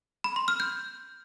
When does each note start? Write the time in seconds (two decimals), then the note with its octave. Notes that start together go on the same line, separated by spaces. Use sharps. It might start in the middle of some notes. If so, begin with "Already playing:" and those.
0.24 B5
0.36 C6
0.48 F6
0.60 G6